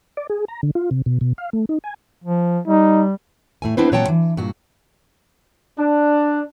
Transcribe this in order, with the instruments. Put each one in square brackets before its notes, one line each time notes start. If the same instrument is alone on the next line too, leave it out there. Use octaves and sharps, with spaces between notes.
[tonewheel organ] D5
G#4
A#5
D3
F4
C3
B2
B2
F5
A3
D#4
G#5
[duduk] F3
[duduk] G3 [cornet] D#4
[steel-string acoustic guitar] A2 A3 G#5
B3 C4 D4 E4 B4 C5
A#2 F#3 C#5 F#5 G5 A5
E3
G2 A#2 F#4
[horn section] D4